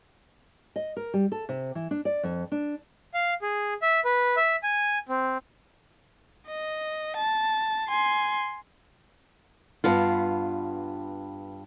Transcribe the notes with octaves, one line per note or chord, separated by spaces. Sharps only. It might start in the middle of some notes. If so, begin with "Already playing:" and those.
D#5
A#4
G3
A4
C3
E3
D4
D5
F2
D4
F5
G#4
E5
B4
E5
G#5
C4
D#5
A5
G#5 C6
G2 B3 F4